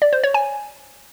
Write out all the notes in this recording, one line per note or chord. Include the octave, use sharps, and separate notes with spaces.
D5
C5
C#5
G#5